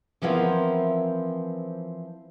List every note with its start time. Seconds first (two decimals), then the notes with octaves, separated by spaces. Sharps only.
0.22 E3 F3 B3 C4 E4 A#4